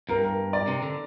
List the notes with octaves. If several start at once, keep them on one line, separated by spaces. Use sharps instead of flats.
G2 A#4
A#4
D5
C3
D3